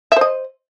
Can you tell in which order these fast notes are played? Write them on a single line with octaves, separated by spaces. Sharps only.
E5 C5 D#5